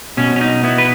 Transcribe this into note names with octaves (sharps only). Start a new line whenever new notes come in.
B2 C#4
C#4
D#4
B3 E4
B4